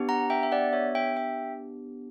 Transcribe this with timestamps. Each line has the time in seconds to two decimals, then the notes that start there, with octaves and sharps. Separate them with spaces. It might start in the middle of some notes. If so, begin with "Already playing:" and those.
Already playing: B3 D4 G4
0.09 F#5 A#5
0.30 E5 G5
0.43 E5
0.52 D5 F#5
0.73 C#5 E5
0.95 E5 G5
1.17 E5 G5